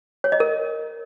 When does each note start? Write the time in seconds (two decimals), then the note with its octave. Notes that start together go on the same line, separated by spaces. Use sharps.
0.24 C#5
0.32 D#5
0.40 A#4